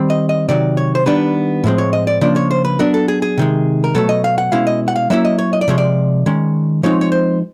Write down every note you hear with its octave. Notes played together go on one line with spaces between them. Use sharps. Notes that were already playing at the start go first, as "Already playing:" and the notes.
Already playing: D#3 G3 C4
D#5
D#5
C3 D#3 F#3 D5
C#5
C5
D#3 G3 B3 D4 B4
A2 F3 G#3 C4
C#5
D#5
D5
C#3 F3 A#3 D4 D5
C#5
C5
B4
F#3 B3 D4 A#4
A4
G#4
G#4
C3 D#3 G#3
A#4
B2 F#3 A3 A4
D#5
F5
F#5
B2 G#3 C#4 E4 F5
D#5
F#5
F5
F#3 A#3 C#4 E4 E5
D#5
C#5
D#5
D5
C3 F3 G#3 C#5
D5
D#3 G#3 C#4
F3 G#3 C4 D#4 C#5
C#5
C5